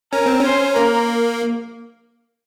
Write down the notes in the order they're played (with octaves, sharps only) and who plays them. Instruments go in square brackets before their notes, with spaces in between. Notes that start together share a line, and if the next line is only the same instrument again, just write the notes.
[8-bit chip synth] C#4 [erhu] A#4
[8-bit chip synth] C4
[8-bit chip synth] C#4 [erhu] C5
[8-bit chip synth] A#3 [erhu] A#4